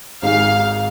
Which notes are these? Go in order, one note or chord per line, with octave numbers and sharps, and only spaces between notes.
G#1 G#2 G#3 D#4 G#4 F5